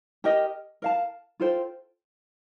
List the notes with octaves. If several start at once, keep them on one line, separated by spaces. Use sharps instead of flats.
G4 A#4 D#5
A#4 F5 A5
F4 A4 C5 G5